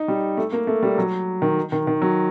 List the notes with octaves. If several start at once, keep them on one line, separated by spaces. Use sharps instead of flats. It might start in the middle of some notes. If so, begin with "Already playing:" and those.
Already playing: D#4
G3
A3
A#3
A3
G3
F#3
D#3
D#3
D#3
F#3